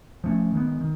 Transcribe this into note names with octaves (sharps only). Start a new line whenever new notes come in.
F3 A3 C#4
D#3 G#3 B3
D#3